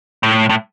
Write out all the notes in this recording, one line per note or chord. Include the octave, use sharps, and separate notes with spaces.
A2
A2